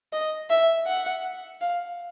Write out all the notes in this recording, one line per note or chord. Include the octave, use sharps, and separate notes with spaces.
D#5
E5
F#5
F5